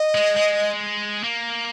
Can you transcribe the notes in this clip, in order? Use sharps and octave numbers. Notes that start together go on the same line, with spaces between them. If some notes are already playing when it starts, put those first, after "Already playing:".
Already playing: D#5
G#3
G#3
A#3